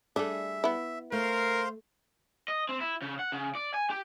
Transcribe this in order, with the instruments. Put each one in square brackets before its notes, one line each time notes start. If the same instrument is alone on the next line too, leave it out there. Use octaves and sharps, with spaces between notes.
[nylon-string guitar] G3 G#4 [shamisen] A3 D4 [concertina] E5
[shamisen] B3 E4
[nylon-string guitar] A3 [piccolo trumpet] A#4 [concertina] C5 F5 C6
[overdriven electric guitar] D#5
C4
E4
C#3
F#5
C#3
D5
G#5
G4